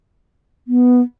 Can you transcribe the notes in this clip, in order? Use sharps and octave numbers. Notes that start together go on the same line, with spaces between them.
B3